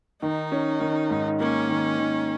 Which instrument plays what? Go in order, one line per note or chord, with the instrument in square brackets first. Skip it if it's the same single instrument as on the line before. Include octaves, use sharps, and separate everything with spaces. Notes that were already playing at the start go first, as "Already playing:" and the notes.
[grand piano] D#3 [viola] D#4
[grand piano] C#4
D#3
G#2
[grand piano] A#3 [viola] C#4
[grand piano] D#3
D#3